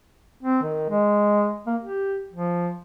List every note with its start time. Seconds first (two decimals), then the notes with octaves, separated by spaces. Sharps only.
0.43 C4
0.63 D#3
0.90 G#3
1.67 A#3
1.82 G4
2.33 F3